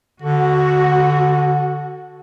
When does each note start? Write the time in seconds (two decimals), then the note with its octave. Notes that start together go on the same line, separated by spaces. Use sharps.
0.22 D3 F#4